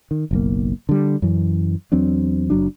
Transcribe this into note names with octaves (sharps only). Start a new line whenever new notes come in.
D#3
F#1 B1 A#3
D3 G3
F#2 E3
E2 F#3 C4 D4
F#1 F#3 D4